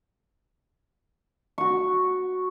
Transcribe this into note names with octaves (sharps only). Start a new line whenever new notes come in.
F#4 C#6